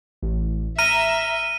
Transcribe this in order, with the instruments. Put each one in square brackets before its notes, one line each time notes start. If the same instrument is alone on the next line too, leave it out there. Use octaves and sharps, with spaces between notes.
[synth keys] A1
[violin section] E5 [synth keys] A#5 [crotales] F6 D#7